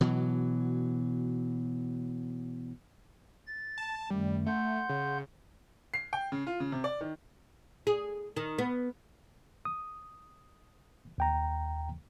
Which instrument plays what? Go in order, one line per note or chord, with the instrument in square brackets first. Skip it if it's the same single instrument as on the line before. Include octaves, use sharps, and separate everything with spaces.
[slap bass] B2 E3 F#3
[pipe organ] A6
[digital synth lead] A5
[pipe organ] F#2 D#3 A3 [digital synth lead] G3
[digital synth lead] A3 [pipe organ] F#5 C6 G6
[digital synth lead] C#3
[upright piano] C7
G5
C#3
F4
C#3
C3
D5
D#3
[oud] G#4
D#3
B3
[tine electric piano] D#6
D#2 G5 A#5